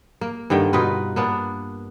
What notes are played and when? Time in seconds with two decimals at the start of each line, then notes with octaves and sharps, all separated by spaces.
0.21 A#3
0.50 G2 D3 D#3 G5
0.73 B2 D#4 F4 B4
1.16 A#3 B3 D4